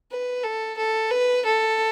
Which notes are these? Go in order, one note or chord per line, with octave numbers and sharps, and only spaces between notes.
B4
A4
A4
B4
A4